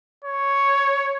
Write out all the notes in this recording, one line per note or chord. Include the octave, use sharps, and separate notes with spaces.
C#5